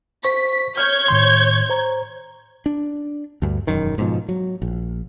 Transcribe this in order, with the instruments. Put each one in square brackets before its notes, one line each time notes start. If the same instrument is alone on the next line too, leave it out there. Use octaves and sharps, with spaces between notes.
[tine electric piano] C5 C#6 [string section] B6
[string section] C#5 G6 G#6 [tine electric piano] F6
[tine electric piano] A2 D#3 C6
C5 A#5
[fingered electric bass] D4
D2 G2
E1 F#2 D#3
G#2 B2 F3
F#3
A#1